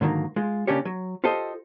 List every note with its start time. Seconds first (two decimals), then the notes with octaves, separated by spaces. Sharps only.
0.01 G#2 D3 D#3 F#3 A#3
0.36 G#3 F4
0.67 C#3 A#3 C#4 D4 G4 C#5
0.85 F#3
1.24 F4 G4 A4 C5 D#5